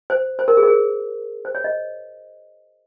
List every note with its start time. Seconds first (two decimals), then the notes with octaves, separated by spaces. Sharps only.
0.10 C5
0.39 C5
0.48 A#4
0.57 G#4
0.63 A#4
0.68 G#4
1.45 C5
1.55 C#5
1.64 D#5